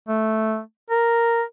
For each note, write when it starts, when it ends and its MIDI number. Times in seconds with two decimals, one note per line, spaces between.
0.08 0.60 57
0.90 1.43 70